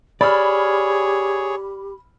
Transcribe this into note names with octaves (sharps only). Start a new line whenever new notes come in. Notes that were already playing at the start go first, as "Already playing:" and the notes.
G4 G#4 C#5 D5 B5 E6 F6